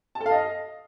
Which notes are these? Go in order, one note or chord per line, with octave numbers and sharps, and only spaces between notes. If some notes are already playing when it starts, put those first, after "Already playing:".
A5
A4
F5
D#5